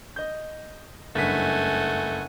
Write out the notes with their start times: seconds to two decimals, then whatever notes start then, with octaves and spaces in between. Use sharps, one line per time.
0.16 D#5 G6
1.15 F#1 G2 A3 F#5 G#5 B6